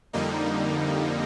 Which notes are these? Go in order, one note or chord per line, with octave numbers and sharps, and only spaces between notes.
F2 D3 G3 A#3 D#4